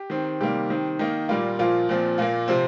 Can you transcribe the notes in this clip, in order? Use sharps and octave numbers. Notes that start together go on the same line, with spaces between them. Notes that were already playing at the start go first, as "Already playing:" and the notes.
Already playing: G4
D#3 C4
C3 D#3 G3 A#3 G4
D#3 C4
D#3 A#3 D#4
A#2 G3 A#3 F4
A#2 F3 A#3 F4
A#2 F3 C4
A#2 A#3 F4
C3 F3 C4